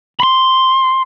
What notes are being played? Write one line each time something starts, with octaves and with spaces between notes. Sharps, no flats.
B5 C6